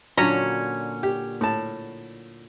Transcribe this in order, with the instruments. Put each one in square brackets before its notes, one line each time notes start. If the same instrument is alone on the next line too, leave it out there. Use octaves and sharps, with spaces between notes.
[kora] A#2 D3 F#3 [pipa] C#4 A#5 [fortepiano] C#5
[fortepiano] G4
A2 A5